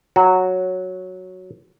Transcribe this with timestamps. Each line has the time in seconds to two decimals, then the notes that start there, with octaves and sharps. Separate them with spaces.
0.16 F#3 F#4